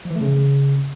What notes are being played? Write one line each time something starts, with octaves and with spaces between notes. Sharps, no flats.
F3
E3
A3
C#3